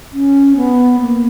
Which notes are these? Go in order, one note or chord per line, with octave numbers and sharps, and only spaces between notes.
C#4
B3
A#3